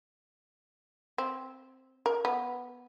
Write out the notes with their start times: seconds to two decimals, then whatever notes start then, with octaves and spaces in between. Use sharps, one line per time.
1.18 C4
2.06 A#4
2.25 B3